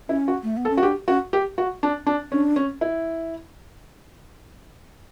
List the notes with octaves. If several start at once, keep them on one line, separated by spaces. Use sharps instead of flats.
C#4 E4
F#4
A3
B3
A4
C#4
F#4
D4 G4
C#4 F#4
G4
F#4
D4
D4
C#4 D4
C#4
E4